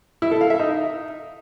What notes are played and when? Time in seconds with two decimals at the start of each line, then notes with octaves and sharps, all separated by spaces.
0.22 E4
0.31 A4
0.41 F5
0.50 E5
0.60 D#4